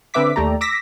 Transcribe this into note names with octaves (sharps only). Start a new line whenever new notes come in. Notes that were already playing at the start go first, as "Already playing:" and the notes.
D3 C4 B4 E5 D6 B6
D#2 A3 G4 D5 A#5
D6 E6 A#6 B6